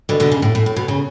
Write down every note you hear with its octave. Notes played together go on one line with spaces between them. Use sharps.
B2 D3
B2 D3
C#3
A2
A2
A2
B2
C#3